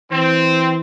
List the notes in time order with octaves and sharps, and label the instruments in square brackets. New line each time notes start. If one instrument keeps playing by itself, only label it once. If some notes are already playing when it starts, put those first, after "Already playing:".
[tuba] E3 [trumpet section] C4